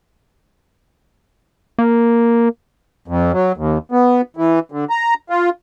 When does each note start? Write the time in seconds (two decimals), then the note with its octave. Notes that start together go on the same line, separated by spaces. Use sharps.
1.78 A#3
3.08 F2
3.32 F#3
3.57 D#2
3.92 B3
4.37 E3
4.72 D3
4.90 A#5
5.30 F4